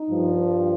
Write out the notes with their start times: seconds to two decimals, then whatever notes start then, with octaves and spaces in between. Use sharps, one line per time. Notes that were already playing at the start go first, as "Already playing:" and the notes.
Already playing: D#4
0.10 G2 F3